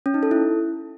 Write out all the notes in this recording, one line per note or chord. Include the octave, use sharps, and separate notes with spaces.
C#4
D#4
A4
E4